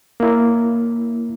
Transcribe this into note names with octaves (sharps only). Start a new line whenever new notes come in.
A#3 E4